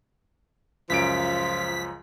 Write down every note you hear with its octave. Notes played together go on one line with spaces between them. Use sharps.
C#2 F#2 F3 F4 B6 D7